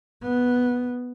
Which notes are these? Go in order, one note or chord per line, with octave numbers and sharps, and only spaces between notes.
B3